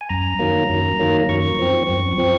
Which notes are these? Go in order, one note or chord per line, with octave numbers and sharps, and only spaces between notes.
G#5
F#2 A#5
D#3 F#3 A#3
F#2
D#3 F#3 A#3
F#2 C#6
F3 C4
F#2
F3 C4